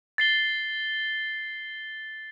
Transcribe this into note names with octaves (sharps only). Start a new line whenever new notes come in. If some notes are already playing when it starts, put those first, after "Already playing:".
A6 C7 G7